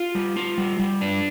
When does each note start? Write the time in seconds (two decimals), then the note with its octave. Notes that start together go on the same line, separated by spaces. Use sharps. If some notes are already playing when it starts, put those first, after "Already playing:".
Already playing: F4
0.15 G3
0.36 F4
0.58 G3
0.80 G3
1.01 D4